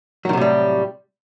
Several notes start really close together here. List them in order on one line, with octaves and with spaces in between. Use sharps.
F#3 D#3 C3 A2 G3